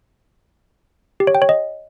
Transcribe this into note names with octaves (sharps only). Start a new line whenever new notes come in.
G4
C#5
G5
C#5
D#5